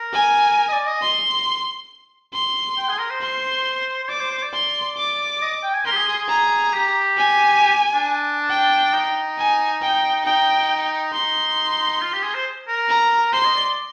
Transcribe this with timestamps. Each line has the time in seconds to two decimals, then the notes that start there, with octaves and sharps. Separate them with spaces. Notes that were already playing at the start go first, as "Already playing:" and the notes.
Already playing: A#4
0.13 G#5
0.57 A#4
0.68 D#5
0.72 D5
0.86 D#5
1.01 C6
2.33 C6
2.78 G5
2.89 G#4
2.99 A#4
3.10 C5
3.21 C6
4.04 C5
4.09 D5 D6
4.20 C5
4.31 C5
4.43 D5
4.53 C6
4.97 D6
5.42 D#5
5.63 G5
5.74 G#5
5.85 A#4 C6
5.92 G4
5.96 G#4
6.07 G#4
6.18 G#4
6.29 A#5
6.73 G4
7.17 G#5
7.61 G4
7.94 D4
8.50 G5
8.93 D#4
9.38 G#5
9.81 G5
10.25 D#4 G5
11.13 D#4 C6
12.01 F4
12.13 G4
12.23 G#4
12.34 C5
12.67 A#4
12.89 A#5
13.33 C5 C6
13.45 D#5
13.55 D5